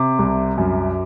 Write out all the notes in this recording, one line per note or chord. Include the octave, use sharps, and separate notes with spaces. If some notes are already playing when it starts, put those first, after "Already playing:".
Already playing: C3 D6
C2
F#2